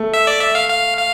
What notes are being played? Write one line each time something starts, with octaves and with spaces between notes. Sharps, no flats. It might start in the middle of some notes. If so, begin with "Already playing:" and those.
Already playing: A3
E5
D5
E5
F5
F5
F5